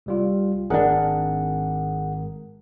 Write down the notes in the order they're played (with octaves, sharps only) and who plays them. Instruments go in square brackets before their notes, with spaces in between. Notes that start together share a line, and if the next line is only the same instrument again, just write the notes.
[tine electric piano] C2 G3 F4
[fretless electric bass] G#1 C#4 D4 [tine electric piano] G#4 A#4 F#5